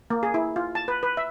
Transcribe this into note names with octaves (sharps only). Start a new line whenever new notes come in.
A#3
G#4
E4
F4
A5
B4
B4
E5